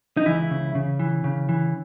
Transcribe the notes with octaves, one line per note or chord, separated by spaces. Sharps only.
D#4
C#2 E3 E4
C#3
C#3
E3
C#3
E3